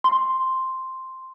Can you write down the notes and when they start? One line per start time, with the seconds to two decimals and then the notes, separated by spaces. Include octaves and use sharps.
0.04 C6